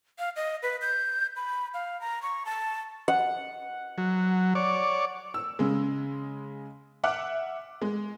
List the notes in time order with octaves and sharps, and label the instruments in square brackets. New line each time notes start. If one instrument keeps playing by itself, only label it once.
[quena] F5
D#5
B4
G6
B5
F5
A#5
C#6
A5
[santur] F#5
[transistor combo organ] F#3
C#5 D5
[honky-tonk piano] E6
C#3 G#3
E5 F#5 D6 F6 F#6
G#3